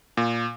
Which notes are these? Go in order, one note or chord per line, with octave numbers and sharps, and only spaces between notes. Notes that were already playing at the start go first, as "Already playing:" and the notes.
A#2